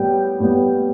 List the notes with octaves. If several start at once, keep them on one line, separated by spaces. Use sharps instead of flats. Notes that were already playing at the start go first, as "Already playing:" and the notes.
Already playing: A2 G3 B3 G5
A2 G3 B3